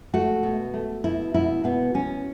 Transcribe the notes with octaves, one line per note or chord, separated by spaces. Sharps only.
A3 F#4
B2
A3
B2 E4
B2 E4
B2 B3
B2 C#4